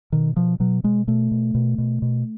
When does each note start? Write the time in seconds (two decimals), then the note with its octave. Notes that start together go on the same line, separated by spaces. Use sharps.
0.12 B2 D#3
0.36 B2 F3
0.60 B2 F#3
0.84 B2 G#3
1.07 B2 A3
1.31 B2
1.55 B2
1.78 B2
2.02 B2